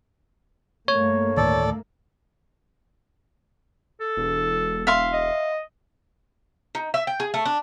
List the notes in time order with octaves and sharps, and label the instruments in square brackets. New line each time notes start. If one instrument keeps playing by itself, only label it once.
[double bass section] G2 A3 A#3 [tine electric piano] C#5
[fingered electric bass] D2 A2 D#3 [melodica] A4 D5
[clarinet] A4
[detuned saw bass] E1
[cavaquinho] E5 F5 C6
[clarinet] D#5
[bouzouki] D#4
E5
G5
G#4
A3
D4